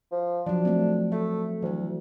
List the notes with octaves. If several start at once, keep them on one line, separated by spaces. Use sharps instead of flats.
F3
F3 F#3 D4
A3 C4
A3 A4
D2 E3 F#3